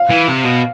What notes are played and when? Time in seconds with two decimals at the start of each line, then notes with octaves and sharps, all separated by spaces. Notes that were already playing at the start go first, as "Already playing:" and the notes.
Already playing: F5
0.10 E3
0.28 C3
0.44 B2